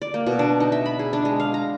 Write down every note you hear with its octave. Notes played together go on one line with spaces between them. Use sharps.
D5
A#3
B2
D4
D#4
E5
B5
G#4
D4
G#3
F5
A#5